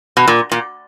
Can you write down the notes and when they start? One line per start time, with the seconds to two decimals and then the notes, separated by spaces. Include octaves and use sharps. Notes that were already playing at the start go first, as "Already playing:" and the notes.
0.17 B2
0.28 A#2
0.52 A#2